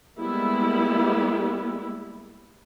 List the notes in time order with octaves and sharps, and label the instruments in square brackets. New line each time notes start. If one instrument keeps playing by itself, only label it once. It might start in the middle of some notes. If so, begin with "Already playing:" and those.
[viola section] G3 G#3 A#3 B3 E4